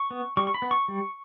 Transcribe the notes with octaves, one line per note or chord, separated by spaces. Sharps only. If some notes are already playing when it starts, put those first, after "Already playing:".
Already playing: C#6
B3
G3 C#6
C#6
B5
B3
C#6
G3